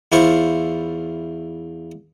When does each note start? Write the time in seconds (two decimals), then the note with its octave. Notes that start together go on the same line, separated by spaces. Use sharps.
0.12 E2 E4 F4 C5 C#6